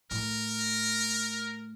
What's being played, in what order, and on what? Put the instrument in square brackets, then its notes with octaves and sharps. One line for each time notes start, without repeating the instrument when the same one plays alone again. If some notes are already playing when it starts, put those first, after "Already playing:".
[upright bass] A2 [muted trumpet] A#4